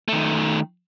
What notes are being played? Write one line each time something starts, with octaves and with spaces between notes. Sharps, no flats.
D#3 A3